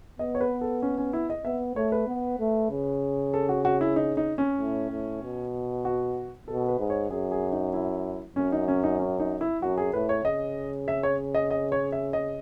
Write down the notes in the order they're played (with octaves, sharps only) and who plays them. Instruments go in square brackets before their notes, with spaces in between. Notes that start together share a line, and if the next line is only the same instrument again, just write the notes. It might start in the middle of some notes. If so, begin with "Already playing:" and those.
[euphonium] B3 [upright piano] D#5
[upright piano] C#5
B4
A4
C#4
C#4
E4
D#5
[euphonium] B3 [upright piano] E5
[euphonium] A3 [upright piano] C#5
[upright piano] B4
[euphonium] B3
A3
C#3
[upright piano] A4
F#4
F#4
E4
D#4
D#4
C#4
[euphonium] A2
A2
B2
[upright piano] F#4
[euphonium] B2 [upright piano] A4
[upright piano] B4
[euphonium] G#2
[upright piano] C#5
[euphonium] F#2 [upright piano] G#4
[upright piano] G#4
D#4
E4
[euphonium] F#2 [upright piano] C#4
[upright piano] D#4
C#4
D#4
C#4
D#4
E4
[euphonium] F#2 [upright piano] F#4
[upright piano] G#4
[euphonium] A2 [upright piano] B4
[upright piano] C#5
[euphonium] C#3 [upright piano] D#5
[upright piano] E5
C#5
D#5
D#5
C#5
E5
D#5